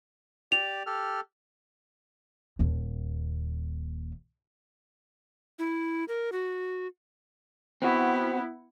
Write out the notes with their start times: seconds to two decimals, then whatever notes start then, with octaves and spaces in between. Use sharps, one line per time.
0.52 G4 D5 F7
0.86 G4 A4 F6
2.59 D#1 D#2
5.59 E4
6.08 A#4
6.32 F#4
7.82 B3 C4 E4 F#4